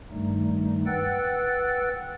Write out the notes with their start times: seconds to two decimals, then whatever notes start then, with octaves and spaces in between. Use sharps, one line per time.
0.11 G2 D#3 G3 A3 D#4
0.86 B4 F#5 G5 E6 F#6 A6